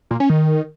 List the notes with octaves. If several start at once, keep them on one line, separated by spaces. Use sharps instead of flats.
A#2
C#4
D#3